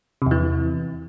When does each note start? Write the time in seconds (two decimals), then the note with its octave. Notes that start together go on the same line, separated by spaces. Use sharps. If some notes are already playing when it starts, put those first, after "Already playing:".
0.22 C3
0.26 E2
0.31 E3